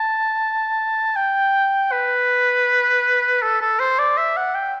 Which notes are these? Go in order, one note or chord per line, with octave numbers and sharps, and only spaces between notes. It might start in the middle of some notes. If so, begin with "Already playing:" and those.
Already playing: A5
G5
B4
A4
A4
C5
D5
E5
F#5
G5